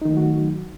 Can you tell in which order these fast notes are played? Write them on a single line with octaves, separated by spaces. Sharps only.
D#4 D#3 A3 F#3 F#4